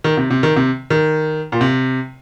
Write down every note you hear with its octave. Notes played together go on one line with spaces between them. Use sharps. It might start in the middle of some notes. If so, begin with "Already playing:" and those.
D#3
C3
C3
D#3
C3
D#3
A#2
C3